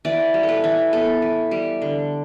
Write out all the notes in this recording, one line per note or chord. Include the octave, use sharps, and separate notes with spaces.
E3 D5
G3
A4
B4
E3
B3 A4
E3
G3
D3